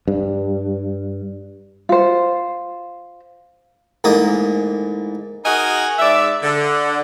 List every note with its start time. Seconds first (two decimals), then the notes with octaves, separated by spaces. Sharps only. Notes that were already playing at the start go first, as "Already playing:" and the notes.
0.08 G2
1.89 F4 C5
4.04 A1 G#2 A#3 D#6
5.44 D#4 F#4 G#4 A#4 D#5 G#5
5.99 G#2 D5 E5
6.42 D3